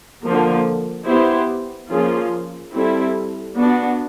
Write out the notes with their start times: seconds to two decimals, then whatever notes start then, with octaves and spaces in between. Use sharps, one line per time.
0.24 D3 F3 A#3
1.07 B3 E4 G4 C5
1.91 F3 A#3 C#4 F4 G#4
2.73 G3 C4 E4 A4
3.57 B3 D4 F#4